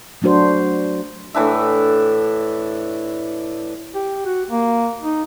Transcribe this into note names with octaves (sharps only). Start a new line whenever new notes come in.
F#3 A3 D4 F#4 C5
A2 E3 D4 E5
G4
F#4
A#3
D#4